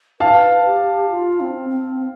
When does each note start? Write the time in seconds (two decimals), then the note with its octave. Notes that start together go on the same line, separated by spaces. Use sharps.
0.20 B4 F5 A5
0.66 G4
1.10 F4
1.40 C4
1.69 C4
2.00 C4